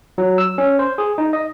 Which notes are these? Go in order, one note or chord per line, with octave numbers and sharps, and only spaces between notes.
F#3
E6
C#4
C5
G#4
D#4
D#5